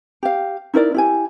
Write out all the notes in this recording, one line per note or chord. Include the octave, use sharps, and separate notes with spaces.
G4 F5
D#4 E4 A#4 D5
E4 G4 G#5